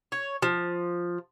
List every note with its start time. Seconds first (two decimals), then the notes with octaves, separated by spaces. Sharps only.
0.12 C#5
0.42 F3